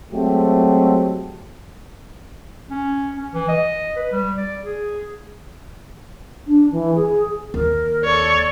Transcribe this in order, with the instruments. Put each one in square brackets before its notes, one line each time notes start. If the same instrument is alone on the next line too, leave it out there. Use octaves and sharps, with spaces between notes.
[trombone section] F#3 G#3 A3 C4 G4
[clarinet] C#4
C#4
E3
D#5
B4
G3
D5
G#4
[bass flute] D4
E3
G#4
[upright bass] D#2 [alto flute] A#4
[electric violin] A4 C#5 [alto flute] D5